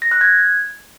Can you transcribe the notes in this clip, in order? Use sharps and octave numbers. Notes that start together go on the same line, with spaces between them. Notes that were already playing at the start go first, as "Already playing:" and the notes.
A#6
F#6
G#6